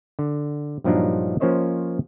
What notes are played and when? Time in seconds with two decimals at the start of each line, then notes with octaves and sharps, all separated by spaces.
0.19 D3
0.84 G2 A#2 F3 F#3 D4 D#4
1.40 F3 A#3 C#4 C5 C#5 D#5